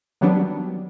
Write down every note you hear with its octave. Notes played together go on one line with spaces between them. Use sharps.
D#3 F#3 G3 B3 D4